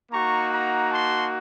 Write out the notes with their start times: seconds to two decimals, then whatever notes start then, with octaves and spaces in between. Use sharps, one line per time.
0.12 A#3 D#4 F#4 A#5 C#6
0.52 F#5 A#5
0.92 A5 C6